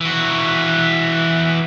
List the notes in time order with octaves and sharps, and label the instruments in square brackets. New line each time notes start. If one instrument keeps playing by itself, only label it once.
[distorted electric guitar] E3 F#4